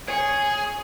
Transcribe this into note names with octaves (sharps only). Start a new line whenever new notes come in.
G#4 C#5 G#5 C#6